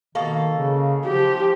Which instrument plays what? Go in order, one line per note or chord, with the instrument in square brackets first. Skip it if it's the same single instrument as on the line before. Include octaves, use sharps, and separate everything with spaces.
[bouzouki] B2 A#3 A4 [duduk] D#3
[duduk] C#3
[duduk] F3 [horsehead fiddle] G4